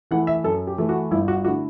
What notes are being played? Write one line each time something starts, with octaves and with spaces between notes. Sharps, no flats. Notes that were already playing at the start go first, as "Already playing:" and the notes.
E3 A3 E4 F#5
E5
F#2 A4
G4
E3 A3 E4
F#4
G1 E4
F#4
D3 A3 E4 F#4